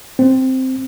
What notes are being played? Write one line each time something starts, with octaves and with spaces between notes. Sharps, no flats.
C4